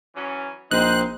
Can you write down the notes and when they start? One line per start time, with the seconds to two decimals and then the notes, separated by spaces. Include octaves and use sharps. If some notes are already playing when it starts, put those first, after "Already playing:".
0.15 E3 F#3 C#4
0.71 A#1 C4 D#4 C5 F#6